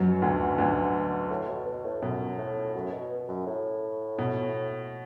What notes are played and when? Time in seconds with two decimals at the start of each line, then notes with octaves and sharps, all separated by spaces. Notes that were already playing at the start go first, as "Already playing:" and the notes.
Already playing: F#2 B2 F#3
0.22 D2 D3
0.58 D2 D3
1.30 A2
1.48 B2
1.66 B2
1.84 A2
2.02 F#2 B2
2.38 A2
2.75 F#2
2.92 B2
3.28 F#2
3.46 A2
4.18 B2